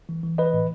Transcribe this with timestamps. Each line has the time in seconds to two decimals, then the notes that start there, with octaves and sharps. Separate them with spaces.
0.09 E3
0.23 E3
0.38 E3 B4 D#5
0.53 A2